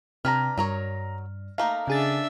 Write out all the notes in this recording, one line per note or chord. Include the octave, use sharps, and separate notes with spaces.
C3 D4 B4 A#5 F6
G2 F#3 A#4 C#5
A3 A#3 D#4 F5
C#3 D4 G#4 E5 A6